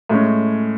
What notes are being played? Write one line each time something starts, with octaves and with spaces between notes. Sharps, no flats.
A2 G#3 C#4